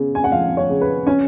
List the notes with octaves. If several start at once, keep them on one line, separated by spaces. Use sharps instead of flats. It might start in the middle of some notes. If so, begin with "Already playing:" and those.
Already playing: C#3 B3
G#5
F#5
F3 F5
C#5
C#3
B4
C#4 G#5